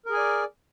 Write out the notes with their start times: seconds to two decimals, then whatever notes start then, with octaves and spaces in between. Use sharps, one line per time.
0.06 A#4
0.10 G#4
0.14 G#5
0.17 D5